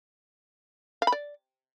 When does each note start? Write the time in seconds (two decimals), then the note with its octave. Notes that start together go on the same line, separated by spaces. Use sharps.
1.02 F5
1.07 B5
1.12 D5